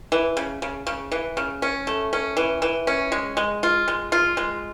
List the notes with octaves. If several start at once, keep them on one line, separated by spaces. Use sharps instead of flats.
E3
C#3
C#3
C#3
E3
C#3
C#4
A3
C#4
E3
E3
C#4
G#3
G#3
F4
G#3
F4
G#3